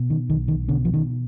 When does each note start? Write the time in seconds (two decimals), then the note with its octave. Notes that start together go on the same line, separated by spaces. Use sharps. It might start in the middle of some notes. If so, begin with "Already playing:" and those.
Already playing: B2
0.10 D#3
0.29 B1 D#3
0.48 D#3
0.68 B2 D3
0.85 F3
0.94 D#3